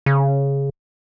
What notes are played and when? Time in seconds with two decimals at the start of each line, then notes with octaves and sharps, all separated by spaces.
0.06 C#3